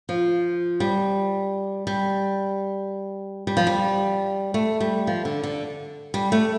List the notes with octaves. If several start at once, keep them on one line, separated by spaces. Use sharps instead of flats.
F3
G3
G3
G3
F3
G3
A3
G3
F3
D3
D3
G3
A3